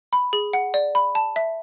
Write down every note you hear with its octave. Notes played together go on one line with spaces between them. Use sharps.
B5
G#4
F#5
D5
B5
A5
E5